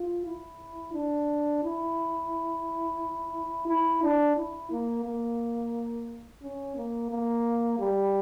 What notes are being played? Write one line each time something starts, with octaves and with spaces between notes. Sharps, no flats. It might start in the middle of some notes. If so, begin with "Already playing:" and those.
Already playing: F4
E4
D4
E4
E4
D4
E4
A#3
A#3
C#4
A#3
A#3
G3